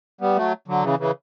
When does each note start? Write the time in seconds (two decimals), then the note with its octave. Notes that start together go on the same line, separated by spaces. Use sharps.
0.21 G3 B3
0.36 F#3 A3
0.68 D3 F#3
0.83 C#3 E3
0.99 C#3 E3